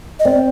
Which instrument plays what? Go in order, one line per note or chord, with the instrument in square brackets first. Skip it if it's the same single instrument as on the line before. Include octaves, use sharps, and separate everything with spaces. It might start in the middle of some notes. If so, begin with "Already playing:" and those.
[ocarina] D#5
[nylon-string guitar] C4 [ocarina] D5